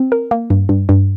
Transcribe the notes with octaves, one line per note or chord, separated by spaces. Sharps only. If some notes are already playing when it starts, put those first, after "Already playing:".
Already playing: C4
A#4
A#3
G2
G2
G2